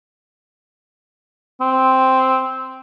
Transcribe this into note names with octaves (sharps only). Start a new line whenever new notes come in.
C4